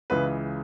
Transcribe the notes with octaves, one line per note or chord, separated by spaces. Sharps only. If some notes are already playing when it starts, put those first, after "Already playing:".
C#2 C#3 E3 B4